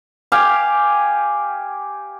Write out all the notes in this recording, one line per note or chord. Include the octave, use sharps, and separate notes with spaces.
G4 F5 G#5